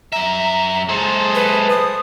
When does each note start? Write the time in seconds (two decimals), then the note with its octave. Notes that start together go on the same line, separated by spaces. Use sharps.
0.13 F#2 E5 A#5
0.89 G#3 G#4 A4 C5 A5
1.35 B4
1.70 D#6